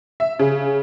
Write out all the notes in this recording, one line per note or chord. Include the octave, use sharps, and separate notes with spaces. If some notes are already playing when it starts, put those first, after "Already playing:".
E5
C#3